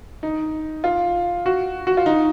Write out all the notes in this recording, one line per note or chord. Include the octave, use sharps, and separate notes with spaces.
D#4
F4
F#4
F#4
F4
D#4